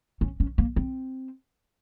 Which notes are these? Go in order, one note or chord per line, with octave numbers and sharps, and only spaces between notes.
C#4
C#4
A#3
C4